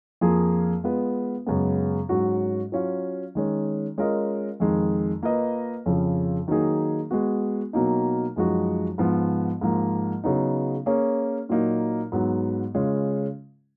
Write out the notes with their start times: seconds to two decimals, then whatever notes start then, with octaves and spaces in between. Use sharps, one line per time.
0.21 F2 F3 A#3 F4 G#4
0.84 G#3 B3 F4 B4
1.46 F#2 C#3 G#3 B3
2.09 G#2 F#3 C#4 F#4
2.72 F#3 C#4 F4
3.35 D#3 G#3 C#4
3.98 G#3 C#4 F4 A#4 D#5
4.60 F2 D#3 G#3
5.23 A#3 F4 B4 D#5
5.86 F2 C#3 F3
6.48 D#3 F#3 A#3 D#4 G#4
7.11 G#3 B3 F#4
7.73 B2 F#3 A#3 D#4
8.36 F#2 F3 G#3 D#4 F#4
8.98 G#2 F3 B3
9.61 G#2 F3 A#3
10.24 C#3 F#3 B3 D#4
10.86 A#3 C#4 G#4 C#5
11.49 A#2 F#3 A#3 D#4
12.12 G#2 F#3 B3
12.75 C#3 G#3 C#4 F4